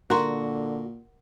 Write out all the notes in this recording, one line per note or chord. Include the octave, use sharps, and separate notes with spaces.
A#2 D3 F#4 A#4 A#5 C6